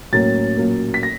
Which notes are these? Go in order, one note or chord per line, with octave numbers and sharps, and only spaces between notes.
A2 F#3 A#3 C#4 A6
A#2 F#3 A#3 C#4
B6
A#6